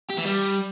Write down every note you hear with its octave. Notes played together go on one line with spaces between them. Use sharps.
G4
E3
G3